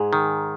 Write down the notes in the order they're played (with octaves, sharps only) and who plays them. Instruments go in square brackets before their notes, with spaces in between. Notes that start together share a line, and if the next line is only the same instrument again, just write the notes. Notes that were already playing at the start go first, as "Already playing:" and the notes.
Already playing: [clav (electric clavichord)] G#2 [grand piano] G#4
[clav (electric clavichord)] D#3